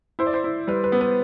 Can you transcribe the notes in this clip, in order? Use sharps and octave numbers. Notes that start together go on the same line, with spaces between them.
E4 C5
D5
C5
E4
G3 B4
B4
B3
B4